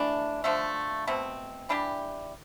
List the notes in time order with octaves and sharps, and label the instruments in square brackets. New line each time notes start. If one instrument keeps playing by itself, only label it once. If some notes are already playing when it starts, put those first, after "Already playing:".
Already playing: [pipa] E3 A3 D4
D3 F3 A3
B2 A3 C4
E3 G3 D4 G4